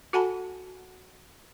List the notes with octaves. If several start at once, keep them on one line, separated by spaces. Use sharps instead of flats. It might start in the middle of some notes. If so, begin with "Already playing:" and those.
F#4 A4 F#5 G#5 A5 B5